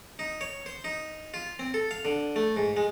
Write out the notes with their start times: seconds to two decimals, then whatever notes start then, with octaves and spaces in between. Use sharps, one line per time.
0.19 D#4
0.41 C#5
0.66 C5
0.84 D#4
1.34 F4
1.59 C4
1.74 A4
1.91 F5
2.05 D3
2.36 A3
2.56 G#2
2.77 G#3